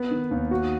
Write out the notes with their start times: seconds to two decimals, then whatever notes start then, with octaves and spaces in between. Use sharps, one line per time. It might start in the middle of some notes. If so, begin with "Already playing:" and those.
Already playing: B3
0.11 D#3
0.31 D#2
0.51 F#4